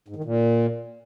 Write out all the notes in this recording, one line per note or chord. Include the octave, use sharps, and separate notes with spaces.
G#2
D#3
A#2